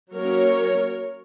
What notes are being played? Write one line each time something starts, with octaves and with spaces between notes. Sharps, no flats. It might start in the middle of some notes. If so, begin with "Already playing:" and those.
F#3 A#3 C#4 A#4 C#5